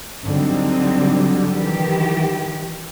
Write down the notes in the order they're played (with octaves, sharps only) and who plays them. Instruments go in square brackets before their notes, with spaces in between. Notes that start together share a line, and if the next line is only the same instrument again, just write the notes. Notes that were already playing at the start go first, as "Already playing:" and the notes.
[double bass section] D3 F#3 G3 [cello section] C4 D#4
[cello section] D#3 E3 G4